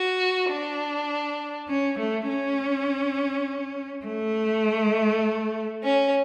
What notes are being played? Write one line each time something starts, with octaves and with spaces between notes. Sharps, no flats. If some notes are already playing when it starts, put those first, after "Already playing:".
Already playing: F#4
D4
C#4
A3
C#4
A3
C#4